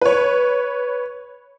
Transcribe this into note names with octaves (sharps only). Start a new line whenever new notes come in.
B4 C#5